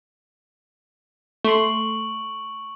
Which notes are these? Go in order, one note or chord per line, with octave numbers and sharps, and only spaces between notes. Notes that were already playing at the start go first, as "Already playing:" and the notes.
A3 C6 C#6 D7 F#7